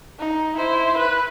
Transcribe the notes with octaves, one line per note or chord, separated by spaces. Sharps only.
D#4
E4 C5
B4